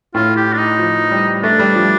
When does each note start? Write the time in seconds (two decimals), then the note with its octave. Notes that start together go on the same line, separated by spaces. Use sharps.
0.15 A2 F4
0.36 G4
0.53 D4
0.57 D#4
0.79 F3
1.11 G3
1.43 A3 D4
1.59 G3
1.75 F3